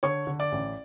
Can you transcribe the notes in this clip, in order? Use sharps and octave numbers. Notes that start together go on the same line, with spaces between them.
D3 C#5 C#6
D3
D5 D6
A1